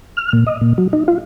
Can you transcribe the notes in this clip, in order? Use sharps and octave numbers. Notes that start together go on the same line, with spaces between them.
F6
A#2
D#5
A#2
F#3
D#4
F4